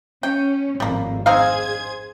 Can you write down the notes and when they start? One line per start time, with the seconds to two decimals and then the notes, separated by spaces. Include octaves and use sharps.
0.23 C#4 G5
0.80 G#1 F2 A2 G3 A#3
1.26 C4 D#4 G#4 C5 F5 G#6